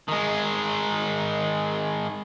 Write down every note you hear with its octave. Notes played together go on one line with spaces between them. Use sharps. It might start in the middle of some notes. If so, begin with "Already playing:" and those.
D#3 G#3